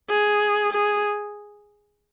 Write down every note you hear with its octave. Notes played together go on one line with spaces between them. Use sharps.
G#4
G#4